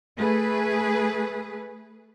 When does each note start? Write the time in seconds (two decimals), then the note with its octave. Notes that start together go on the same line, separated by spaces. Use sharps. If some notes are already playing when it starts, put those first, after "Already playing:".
0.17 A3 G#4 B4